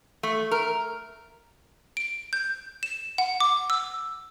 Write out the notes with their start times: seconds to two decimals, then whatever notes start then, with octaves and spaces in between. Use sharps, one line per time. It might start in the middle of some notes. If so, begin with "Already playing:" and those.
0.23 A3
0.51 A#4
1.97 D7
2.33 G6
2.83 E7
3.18 F#5
3.40 D6
3.70 E6